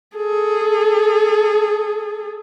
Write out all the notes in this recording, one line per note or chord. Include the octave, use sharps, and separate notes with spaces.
G#4 A4